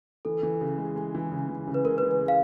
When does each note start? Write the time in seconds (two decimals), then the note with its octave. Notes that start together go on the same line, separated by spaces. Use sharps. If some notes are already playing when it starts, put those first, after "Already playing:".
0.25 E3 A4
0.43 E3
0.61 C#3
0.78 G#3
0.96 G#3
1.15 E3
1.32 C#3
1.49 E3
1.67 C#3
1.74 B4
1.85 G#3 A#4
1.98 B4
2.03 E3
2.11 B4
2.21 G#3
2.28 F5